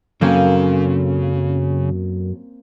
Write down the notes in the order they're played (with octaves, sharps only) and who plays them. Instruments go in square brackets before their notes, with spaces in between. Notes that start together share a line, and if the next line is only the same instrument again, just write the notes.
[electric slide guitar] F#2 F#3 A4 [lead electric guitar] C#3 [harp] A#3 C4 C#4